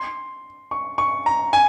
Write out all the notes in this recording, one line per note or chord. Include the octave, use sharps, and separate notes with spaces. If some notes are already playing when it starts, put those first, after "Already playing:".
Already playing: C6
C#6
C#6
A#5
G#5